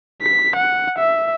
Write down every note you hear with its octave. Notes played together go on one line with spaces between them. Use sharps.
B6
F#5
E5